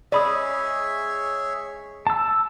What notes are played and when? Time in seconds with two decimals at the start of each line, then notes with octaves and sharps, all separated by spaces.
0.12 G#3 C#4 G#4 C#5 D5 E5 B5 D#6
2.07 A5 E6